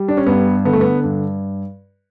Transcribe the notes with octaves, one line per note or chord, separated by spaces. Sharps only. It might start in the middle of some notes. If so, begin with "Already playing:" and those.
Already playing: G3
D4
C#4
G2 B3
D3 B3
A3
B3
G2